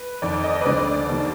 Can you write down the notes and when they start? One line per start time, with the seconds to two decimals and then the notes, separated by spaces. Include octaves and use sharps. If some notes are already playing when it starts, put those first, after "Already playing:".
Already playing: B4
0.22 F2 D#3 D5
0.44 D#5
0.61 B4
0.66 D2 D3 F3 D5
1.09 D#2 D#3